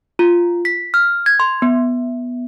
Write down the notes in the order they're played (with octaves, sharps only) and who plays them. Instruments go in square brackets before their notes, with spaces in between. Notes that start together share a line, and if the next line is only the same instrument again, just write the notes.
[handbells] F4
B6
F6
G#6
C6
B3